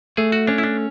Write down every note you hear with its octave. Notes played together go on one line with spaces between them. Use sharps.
A3 G#4
F#4
C#4 D4
E4
D4